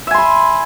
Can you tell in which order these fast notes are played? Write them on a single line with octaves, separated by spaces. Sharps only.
E5 G#5 C6 B5